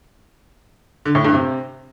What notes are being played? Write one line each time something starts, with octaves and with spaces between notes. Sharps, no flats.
D3
A2
G2
C3